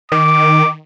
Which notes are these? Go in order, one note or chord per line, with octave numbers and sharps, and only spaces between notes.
D#3 D6